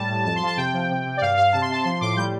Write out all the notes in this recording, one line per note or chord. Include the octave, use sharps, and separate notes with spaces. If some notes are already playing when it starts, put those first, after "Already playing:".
Already playing: A2 G3 A5
A2
F2 A5
C6
F3
A5
C3 G5
F3
C3
C3
D5
G2 F5
G2 F5
C3 A5
C6
C3 A5
F3 C6
A2 D6
G3 G6